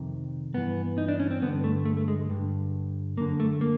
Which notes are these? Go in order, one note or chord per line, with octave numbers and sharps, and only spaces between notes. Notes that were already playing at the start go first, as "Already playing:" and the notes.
Already playing: F2 C3 D#3
G2 E3 B3
D#4
D4
C#4
C4
G2 D3 B3
A3
A3
A3
G#3
G2 D3
F#2 D3 A#3
A3
A#3